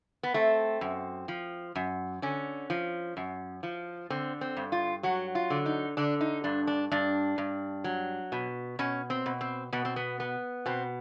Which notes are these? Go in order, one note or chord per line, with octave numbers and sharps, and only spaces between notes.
B3
A3 C4
F#2
F3
F#2
D3 C#4
F3
F#2
F3
D3 C4
C4
G2
F4
F#3 F#4
F4
D3
D#4
D3 D4
D#4
G2 D4
D4
G2 D4
G2
F#3
B2
B2 C#4
C4
B2
C4
B2 B3
C4
B3
B3
B2 C4